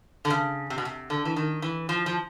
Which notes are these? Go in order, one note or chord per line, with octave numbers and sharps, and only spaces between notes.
D3
C#3
C3
B2
C3
D3
E3
D#3
E3
F3
F3